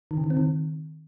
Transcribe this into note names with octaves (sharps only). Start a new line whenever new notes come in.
D#3
C#3
D#3
C4
D#3